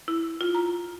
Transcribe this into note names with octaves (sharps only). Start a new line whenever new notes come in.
E4
F4
A#5